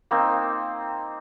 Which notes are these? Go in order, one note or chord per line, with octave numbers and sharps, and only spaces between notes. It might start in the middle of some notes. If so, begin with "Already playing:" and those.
A#3 C4 D#4